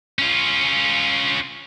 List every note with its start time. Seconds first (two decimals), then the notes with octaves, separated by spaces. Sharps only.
0.19 C#4 F4